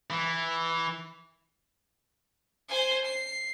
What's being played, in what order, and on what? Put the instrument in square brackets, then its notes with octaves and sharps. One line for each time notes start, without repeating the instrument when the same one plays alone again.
[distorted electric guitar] E3
[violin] C5 G#5
C7